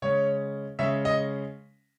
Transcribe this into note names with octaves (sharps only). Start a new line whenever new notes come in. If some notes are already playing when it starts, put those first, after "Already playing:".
C#3 G#3 C#4 C#5
C#3 G#3 C#4 E5
D#5